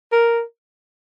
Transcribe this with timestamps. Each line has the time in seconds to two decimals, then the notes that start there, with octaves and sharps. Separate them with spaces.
0.12 A#4